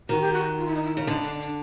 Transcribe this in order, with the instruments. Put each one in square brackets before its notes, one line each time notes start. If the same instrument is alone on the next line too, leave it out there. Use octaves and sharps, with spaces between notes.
[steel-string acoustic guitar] D#3 [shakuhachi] F#4
[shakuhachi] G4
F#4
F4
E4
D#4
E4
[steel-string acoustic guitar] C#3
[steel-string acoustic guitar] D3 [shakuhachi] D#4
[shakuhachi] D4
D4